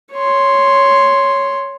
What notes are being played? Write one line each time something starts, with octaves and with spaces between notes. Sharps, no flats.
C#5 C6